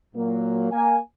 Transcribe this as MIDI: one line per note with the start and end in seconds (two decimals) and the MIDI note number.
0.15 0.67 46
0.15 0.67 54
0.15 0.67 58
0.71 0.98 58
0.71 0.98 80